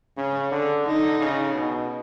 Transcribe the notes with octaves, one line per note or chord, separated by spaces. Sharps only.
C#3 C#4
D3
D3 D#4
C#3
B2